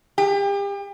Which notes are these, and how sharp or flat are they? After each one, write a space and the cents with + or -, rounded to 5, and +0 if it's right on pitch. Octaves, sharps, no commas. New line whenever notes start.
G4 +35